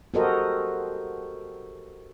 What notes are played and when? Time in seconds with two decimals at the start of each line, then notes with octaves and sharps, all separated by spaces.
0.14 F#4 G4 A4 A#4 C5 D#5